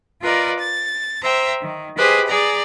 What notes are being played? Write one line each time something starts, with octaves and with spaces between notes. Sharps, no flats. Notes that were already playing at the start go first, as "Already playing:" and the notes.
F4 A#4 B4 D5 D#5
A6
C5 E5 G5 A#5
D#3
G4 G#4 B4 C5 D#5
G#4 D5 A#5